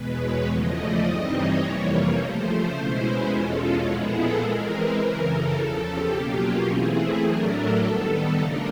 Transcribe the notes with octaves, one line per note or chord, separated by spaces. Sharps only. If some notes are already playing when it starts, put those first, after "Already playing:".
Already playing: E2 B2 G#3 B4
C#5
E2 C#3 F3 A3 D#5
D5
G2 E3 G3 C4 D#4 D#5
C#5
F2 C3 E3 G3 A#3
C#3 F3 A3 C5
C5
B2 G#3 C#4 E4
B4
E2 B2 G#3 C#4 F4 A4
A4
A#2 F3 G#3 B3 E4 G#4
A4
E3 G#3 C4 A#4
B4
F#2 C#3 E3 A#4
A4
E2 C#3 F3
G4
B2 F#3 A#3 C#4 F4
E3 A3 C4 E4 G#4
A2 F#3 A3 D4 A#4
A4
D#3 G3 B3 A4
C#3 F3 A3 D4 F4 A#4